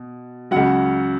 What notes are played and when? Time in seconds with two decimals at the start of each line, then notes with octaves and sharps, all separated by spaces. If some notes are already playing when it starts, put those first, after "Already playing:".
Already playing: B2
0.51 C#2 C#3 F#3 F#5